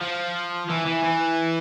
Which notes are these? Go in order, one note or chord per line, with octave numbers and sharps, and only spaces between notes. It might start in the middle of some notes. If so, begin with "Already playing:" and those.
F3
E3
E3
E3